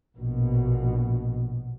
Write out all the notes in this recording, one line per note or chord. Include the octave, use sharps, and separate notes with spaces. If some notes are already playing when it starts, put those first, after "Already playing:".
A#1 B2